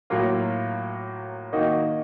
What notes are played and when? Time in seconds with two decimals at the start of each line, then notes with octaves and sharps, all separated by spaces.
0.10 A2 F#3 A#3 F4
1.53 D#3 A#3 D#4 F#4